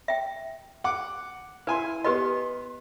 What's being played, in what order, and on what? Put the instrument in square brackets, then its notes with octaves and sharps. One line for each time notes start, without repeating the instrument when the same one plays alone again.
[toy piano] E5 G5
[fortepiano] F#5 D6
[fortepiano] E4 G#5 C6 [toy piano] B4
[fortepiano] B3 C6 [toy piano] G4 B4 D#5